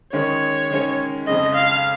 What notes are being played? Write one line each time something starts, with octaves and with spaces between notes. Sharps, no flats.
D#3 G#3 C#4 C#5
D#3 G#3 C#4
F2 C#3 G#3 D#5
F5